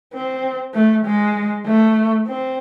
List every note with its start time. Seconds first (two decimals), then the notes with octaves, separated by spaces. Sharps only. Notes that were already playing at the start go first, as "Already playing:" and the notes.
0.14 C4
0.74 A3
1.05 G#3
1.67 A3
2.27 C4